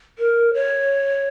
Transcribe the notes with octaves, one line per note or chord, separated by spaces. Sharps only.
A#4
C#5